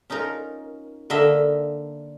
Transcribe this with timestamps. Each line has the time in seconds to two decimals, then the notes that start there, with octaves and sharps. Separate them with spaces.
0.10 C#4 D#4 F4 A#4
1.10 D3 A#3 D#5 E5